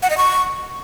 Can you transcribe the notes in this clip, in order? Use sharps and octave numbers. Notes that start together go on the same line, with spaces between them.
F#5
D#5
C#6